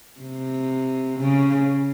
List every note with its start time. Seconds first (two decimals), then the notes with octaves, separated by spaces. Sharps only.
0.20 C3
1.20 C#3